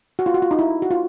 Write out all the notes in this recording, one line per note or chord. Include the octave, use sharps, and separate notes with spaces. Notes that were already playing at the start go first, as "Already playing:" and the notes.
F#4
F4
F#4
F4
D#4
E4
F#4
F4